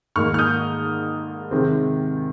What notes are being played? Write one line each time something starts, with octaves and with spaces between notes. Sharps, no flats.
G#2 D#3 A#3 D#4 C#6 F6
F6
D#6 G6
C3 D#3 G#3 C4